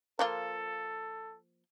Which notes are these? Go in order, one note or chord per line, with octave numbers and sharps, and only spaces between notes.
F3 A#3 F4 A4